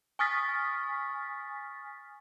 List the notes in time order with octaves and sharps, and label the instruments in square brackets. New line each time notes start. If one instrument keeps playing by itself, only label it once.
[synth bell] G#5 C#6 D#6 F6 A6 B6